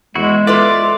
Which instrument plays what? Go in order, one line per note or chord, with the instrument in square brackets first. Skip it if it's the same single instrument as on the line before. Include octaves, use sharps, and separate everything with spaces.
[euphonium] E2 [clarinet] G#3 [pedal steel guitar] E4 F#4
[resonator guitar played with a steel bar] F4 B4 E5 [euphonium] A4 [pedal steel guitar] D5